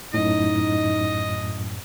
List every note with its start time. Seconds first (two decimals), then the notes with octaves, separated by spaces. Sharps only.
0.14 F#2 A2 D#4 D#5